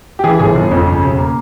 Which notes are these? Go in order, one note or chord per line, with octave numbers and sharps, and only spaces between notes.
G4
E3 G#4
G1 G#4
G1
F2
C#3
E1
A#3